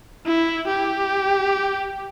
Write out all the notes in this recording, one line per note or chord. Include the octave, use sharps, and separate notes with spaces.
E4
G4